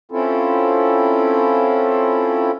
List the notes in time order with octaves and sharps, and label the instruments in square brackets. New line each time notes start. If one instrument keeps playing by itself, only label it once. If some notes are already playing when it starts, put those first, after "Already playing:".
[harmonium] C4 C#4 E4 F4 A4